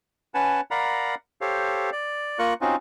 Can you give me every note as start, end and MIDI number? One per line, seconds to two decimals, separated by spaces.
0.34 0.61 61
0.34 0.61 71
0.34 0.61 78
0.34 0.61 80
0.34 0.61 81
0.71 1.15 70
0.71 1.15 74
0.71 1.15 77
0.71 1.15 78
0.71 1.15 82
0.71 1.15 83
1.41 1.90 67
1.41 1.90 69
1.41 1.90 72
1.41 1.90 73
1.41 1.90 77
1.92 2.39 74
2.39 2.54 58
2.39 2.54 65
2.39 2.54 70
2.39 2.54 85
2.39 2.54 90
2.61 2.76 60
2.61 2.76 61
2.61 2.76 63
2.61 2.76 65
2.61 2.76 66